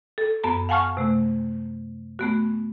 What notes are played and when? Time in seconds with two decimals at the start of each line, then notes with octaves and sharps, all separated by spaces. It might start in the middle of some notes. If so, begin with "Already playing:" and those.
0.18 A4
0.44 F#2 B3 A5 A#5
0.69 F5 F#5 G#5 A5 C#6 F6
0.97 C3 A3
2.19 A3 B3 F#4